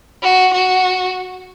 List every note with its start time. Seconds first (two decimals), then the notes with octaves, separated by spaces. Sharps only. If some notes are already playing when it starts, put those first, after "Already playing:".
0.23 F#4
0.53 F#4